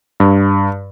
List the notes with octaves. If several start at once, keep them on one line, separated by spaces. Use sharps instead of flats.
G2